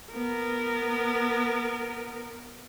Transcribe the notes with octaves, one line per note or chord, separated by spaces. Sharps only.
B3 A#4